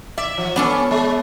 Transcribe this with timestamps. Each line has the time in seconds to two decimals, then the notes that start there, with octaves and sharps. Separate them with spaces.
0.18 D5 E5
0.38 F3
0.56 B3 C#4 D4 A4
0.91 G#3